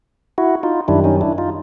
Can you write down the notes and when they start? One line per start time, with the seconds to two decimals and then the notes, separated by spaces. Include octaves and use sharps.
0.38 E4 F#4
0.63 D#4 F4
0.88 F#2 D#3 G3 D4 E4
1.04 C#4 D#4
1.21 D4 E4
1.38 D#4 F4